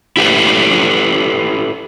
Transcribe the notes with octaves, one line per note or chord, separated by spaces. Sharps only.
E4 G4 A4 B4